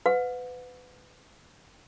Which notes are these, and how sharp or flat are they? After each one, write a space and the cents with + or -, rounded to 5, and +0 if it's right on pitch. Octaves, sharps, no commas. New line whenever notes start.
B4 +25 F#5 -40